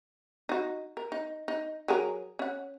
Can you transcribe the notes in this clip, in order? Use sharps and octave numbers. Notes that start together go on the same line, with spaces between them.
D#4 F#4
A#4
D#4
D#4
F#3 G#4 A#4
C#4 F#5